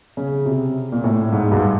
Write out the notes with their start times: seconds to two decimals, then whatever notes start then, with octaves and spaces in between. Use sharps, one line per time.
0.17 C#3
0.46 C3
0.92 A#2
1.04 A2
1.32 G#2
1.51 G2